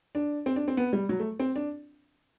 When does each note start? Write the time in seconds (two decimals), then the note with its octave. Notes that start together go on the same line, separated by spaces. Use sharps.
0.15 D4
0.46 C4
0.56 D4
0.68 C4
0.77 B3
0.93 G3
1.09 F#3
1.20 A3
1.40 C4
1.56 D4